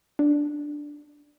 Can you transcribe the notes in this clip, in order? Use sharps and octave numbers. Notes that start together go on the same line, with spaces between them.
D4